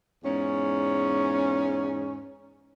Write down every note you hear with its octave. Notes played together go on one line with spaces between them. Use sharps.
E2 G#2 C#4